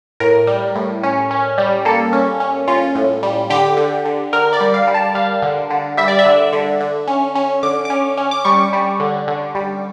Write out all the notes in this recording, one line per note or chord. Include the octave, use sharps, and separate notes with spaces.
A2 A#4
G3
A2
C#4
C#4
G3
A#3 A4
C#4
C#4
C#4 F4
A2
G3
D3 G4
D3
D3
D3 A#4
D5
G3
F5
G3
A5
G3 F5
D3
D3
G3 E5
D5
E5
D3
D3
D3
C#4
C#4
D3 D6
C#4 D6
C#4
D6
G3 C#6
G3
D3
D3
G3